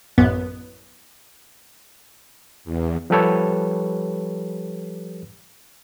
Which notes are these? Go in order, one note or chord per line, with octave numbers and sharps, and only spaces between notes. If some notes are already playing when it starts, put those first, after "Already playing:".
A1 F#2 B3
E2
F3 G3 G4 A4 B4 C#5